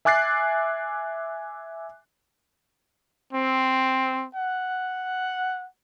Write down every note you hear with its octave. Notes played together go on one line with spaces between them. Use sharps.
E5 G#5 D6 F#6 A6 C7
C4
F#5